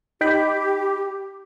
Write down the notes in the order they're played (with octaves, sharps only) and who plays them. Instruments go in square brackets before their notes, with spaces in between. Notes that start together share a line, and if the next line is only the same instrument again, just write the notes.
[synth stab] D#4 G5 B5 [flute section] G4